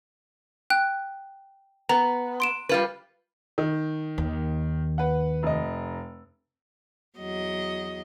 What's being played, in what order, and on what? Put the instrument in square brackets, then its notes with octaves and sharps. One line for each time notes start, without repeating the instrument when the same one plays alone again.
[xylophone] G5 F#6
[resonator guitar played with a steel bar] B3 [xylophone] A#5
[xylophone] C6 D7 E7
[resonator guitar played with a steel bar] G3 F4 B4
[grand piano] D#3
[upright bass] D#2
[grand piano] B4 F#5
F1 D#5
[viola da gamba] E2 F#3 D#5